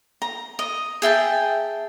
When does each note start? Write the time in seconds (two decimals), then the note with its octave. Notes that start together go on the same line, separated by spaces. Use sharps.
0.22 A#5
0.59 D#5
1.02 G#4 E5 G5 A5